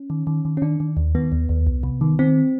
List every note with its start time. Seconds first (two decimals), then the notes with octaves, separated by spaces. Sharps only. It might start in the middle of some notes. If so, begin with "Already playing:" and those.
Already playing: C#4
0.10 D#3
0.27 D#3
0.45 D#3
0.57 C#4
0.62 D#3 D4
0.80 D#3
0.97 D#2
1.15 D#3 B3
1.32 D#2
1.49 D#2
1.67 C2
1.83 C3
2.01 D#3
2.19 D#3 C4